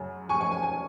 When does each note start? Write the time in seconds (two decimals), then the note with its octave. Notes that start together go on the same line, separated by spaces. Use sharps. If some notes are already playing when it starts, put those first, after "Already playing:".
Already playing: F#2 C#3 F#3
0.29 G#5 C#6
0.41 G#5 C#6
0.51 G#5
0.63 G#5